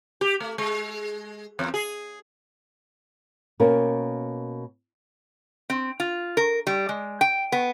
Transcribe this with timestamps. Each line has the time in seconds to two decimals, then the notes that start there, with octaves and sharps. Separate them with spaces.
0.21 G4
0.40 A3
0.58 G#3
1.59 E2
1.74 G#4
3.60 B2 A#3 C#4 A#4
5.70 C4
6.00 F4
6.37 A#4
6.67 G3
6.89 G#3
7.21 G5
7.52 B3